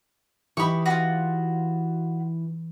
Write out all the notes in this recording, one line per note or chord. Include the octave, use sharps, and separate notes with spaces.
E3 D#4 G4 B5 C#6
F4 F#4 C7